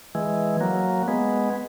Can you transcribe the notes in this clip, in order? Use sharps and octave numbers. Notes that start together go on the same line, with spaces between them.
E3 G#3
F#3 A#3
G#3 B3